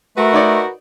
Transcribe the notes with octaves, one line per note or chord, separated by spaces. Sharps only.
A3 F#4 A#4 B4
D#4 C#5 D5